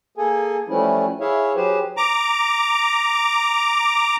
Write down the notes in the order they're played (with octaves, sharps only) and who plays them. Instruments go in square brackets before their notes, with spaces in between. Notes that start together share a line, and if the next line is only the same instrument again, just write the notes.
[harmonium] A#3 G#4 A4 G#5
E3 F3 G3 A3 C#4 E4
E4 G#4 C#5 E5 F5
F#3 G4 G#4 B4 C5
[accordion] A#5 D6